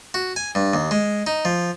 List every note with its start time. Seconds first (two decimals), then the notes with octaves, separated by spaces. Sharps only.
0.14 F#4
0.36 G#5
0.55 G2
0.73 D#2
0.91 G#3
1.27 D#4
1.45 F3